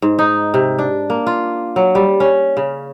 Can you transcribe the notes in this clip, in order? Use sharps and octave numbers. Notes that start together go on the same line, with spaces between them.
G#2
D#4
C3
D4
A#3
F4
F#3
G3
C#4
C#3